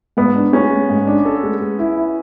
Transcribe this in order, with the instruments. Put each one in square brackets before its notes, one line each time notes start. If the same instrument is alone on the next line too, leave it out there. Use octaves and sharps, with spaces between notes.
[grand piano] G#2 [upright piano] B3
[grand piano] D4
[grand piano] G#3 [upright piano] C#4
[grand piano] G#3
G#2
D4
A4
G#3
G#3
E4
E4